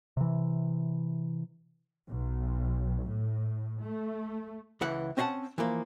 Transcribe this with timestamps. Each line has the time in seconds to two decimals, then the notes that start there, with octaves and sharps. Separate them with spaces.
0.17 C3 E3
2.09 B1
3.04 A2
3.81 A3
4.81 C#2 E3 F#5
5.17 C4 C#4 D#5 F5 F#5 A5
5.58 E3 F3 A#3